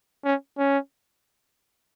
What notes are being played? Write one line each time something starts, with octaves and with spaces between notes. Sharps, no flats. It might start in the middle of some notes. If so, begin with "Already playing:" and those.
C#4
C#4